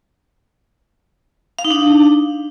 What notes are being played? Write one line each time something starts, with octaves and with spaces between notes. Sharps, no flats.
F5
D#4
D4